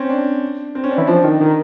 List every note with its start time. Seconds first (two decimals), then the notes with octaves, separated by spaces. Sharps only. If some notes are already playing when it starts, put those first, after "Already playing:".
Already playing: C4 C#4
0.09 D4
0.75 C4
0.84 C#4
0.91 D4
0.98 E3
1.07 F3 D4
1.24 D#3
1.41 D#3